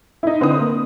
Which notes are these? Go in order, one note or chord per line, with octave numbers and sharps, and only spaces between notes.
D#4 E4
D3 C4 B4 C5 D#6
A#3